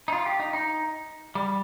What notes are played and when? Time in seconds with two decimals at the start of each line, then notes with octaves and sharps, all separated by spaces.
0.08 D#4
0.12 F4
0.26 G4
0.40 D#4
0.53 D#4
1.35 G3